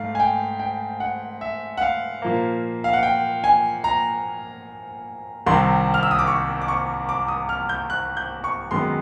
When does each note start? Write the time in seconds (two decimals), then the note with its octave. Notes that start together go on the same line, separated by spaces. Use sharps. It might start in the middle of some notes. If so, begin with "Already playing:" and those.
Already playing: G#2 A3 F5
0.15 G#5
0.20 G5
0.60 G5
1.00 F#5
1.41 E5
1.77 F#5
1.81 F5
2.22 A#2 F3 A#3
2.84 F5
2.93 F#5
3.03 G5
3.44 G#5
3.84 A#5
5.46 C2 C3 D#3 G3 C4 C6
5.94 F6
6.03 E6
6.11 D#6
6.19 D6
6.27 C#6
6.62 D6
6.68 C#6
7.09 D6
7.28 D#6
7.49 F6
7.69 G6
7.90 F#6
8.17 G6
8.44 C#6
8.71 F#2 D#3 G#3 B3 C6